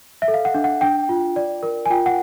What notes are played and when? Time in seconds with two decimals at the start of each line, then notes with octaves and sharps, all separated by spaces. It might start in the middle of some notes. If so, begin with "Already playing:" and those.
0.22 E5
0.28 A4
0.34 F5
0.45 F#5
0.54 D4
0.64 F#5
0.81 D4 G5
1.09 F4
1.36 D5
1.63 A#4
1.86 G#5
1.90 F4 G5
2.06 F#5